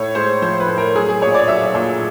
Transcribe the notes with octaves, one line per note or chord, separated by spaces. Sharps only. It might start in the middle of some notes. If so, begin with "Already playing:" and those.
Already playing: A2 C#5
G#3 C5
F3 C5
B4
A2
A#4
F#3 G#4
G#4
A#2 C#5
D5
F#3 E5
A#2